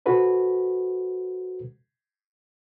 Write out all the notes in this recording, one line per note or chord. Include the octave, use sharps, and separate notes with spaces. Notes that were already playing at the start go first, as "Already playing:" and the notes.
F#4 A4 B4 C5